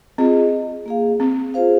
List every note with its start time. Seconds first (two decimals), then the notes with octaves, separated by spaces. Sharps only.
0.18 C4 F4 G#4 D#5
0.86 A#3 G#4 F5
1.20 C4
1.54 F4 G#4 C5 F5